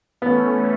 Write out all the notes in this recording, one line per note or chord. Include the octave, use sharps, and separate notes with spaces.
E3 A3 B3 C#4